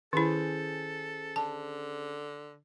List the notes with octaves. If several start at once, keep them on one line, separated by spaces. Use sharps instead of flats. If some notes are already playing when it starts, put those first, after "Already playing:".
D#3 C#4 E4 G#4 A4 C5
D3 A5